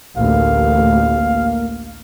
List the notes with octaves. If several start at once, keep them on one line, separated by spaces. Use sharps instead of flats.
A1 D2 A#3 F5